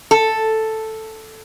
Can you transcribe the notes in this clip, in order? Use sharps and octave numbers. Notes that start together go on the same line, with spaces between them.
A4